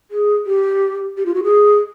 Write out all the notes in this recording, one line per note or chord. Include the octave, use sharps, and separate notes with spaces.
G#4
G4
G4
F4
F#4
G#4